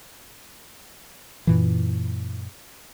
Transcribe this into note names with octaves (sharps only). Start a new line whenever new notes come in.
F#2 A#2 E3